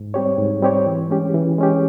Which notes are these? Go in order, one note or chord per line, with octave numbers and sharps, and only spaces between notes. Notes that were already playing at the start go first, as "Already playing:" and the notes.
Already playing: G#2
G3 C4 G4 C#5
G#2
G3 C4 G4 C#5
E3
G#3 C#4 G4
E3
G#3 C#4 G4